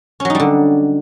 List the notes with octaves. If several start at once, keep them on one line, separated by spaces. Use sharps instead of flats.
D3 F#3 G3 C#4 D#4